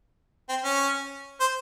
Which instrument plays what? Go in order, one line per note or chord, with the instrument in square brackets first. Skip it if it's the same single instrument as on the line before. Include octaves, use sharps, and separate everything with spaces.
[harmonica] C4
C#4
C5